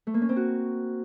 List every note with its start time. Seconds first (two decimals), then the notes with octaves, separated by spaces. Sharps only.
0.07 A3
0.14 A#3
0.22 C#4
0.29 C4
0.36 F#4